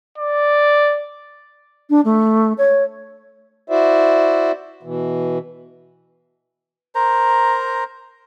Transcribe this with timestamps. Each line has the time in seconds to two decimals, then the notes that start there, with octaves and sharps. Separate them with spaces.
0.18 D5
1.90 D4
2.05 A3
2.58 C#5
3.70 E4 F#4 C5 D5 E5
4.83 B2 E3
6.95 A#4 C5 A#5